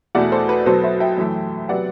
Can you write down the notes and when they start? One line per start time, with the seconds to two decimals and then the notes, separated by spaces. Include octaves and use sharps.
0.15 E2 B2 A3 D5 F#5
0.32 A4 C5
0.49 B4
0.66 B2 F#3 B3 A4 C5
0.84 C5 E5
1.00 E5 G5
1.18 F#2 E3 A3
1.69 C3 F#3 B3 D5 F#5